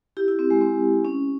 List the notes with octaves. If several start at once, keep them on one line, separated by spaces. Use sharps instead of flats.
E4 G4
E4
C4
G#3
C4
C#4